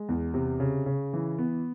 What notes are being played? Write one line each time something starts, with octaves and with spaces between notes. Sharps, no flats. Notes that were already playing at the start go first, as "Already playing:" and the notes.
Already playing: G#3
E2
C3
C#3
C#3
E3
B3